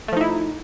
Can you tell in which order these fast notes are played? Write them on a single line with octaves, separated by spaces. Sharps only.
A3 F3 D#4 E4